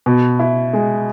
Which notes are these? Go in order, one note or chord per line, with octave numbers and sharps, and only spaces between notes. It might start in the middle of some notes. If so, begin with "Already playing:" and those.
B2
E4
G#3